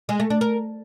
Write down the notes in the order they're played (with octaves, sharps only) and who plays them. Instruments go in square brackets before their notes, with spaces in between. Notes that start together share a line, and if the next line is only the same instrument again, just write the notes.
[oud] G#3
A3
D4
A#4